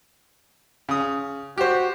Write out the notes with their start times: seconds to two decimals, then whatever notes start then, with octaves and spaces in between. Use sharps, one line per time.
0.89 C#3 D#6
1.58 F#4 G4 C5